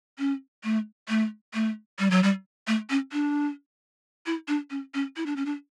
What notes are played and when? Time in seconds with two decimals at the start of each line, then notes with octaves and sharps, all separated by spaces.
0.19 C#4
0.64 A3
1.09 A3
1.54 A3
1.99 G3
2.11 F#3
2.23 G3
2.67 A3
2.90 C#4
3.12 D4
4.26 E4
4.48 D4
4.70 C#4
4.94 C#4
5.17 E4
5.26 D4
5.36 C#4
5.46 D4